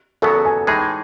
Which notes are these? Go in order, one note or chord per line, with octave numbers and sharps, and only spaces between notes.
E2 C#3 F#3 B3 F#4 A4
G#5
A2 E3 G#3 D#4 G#4 B5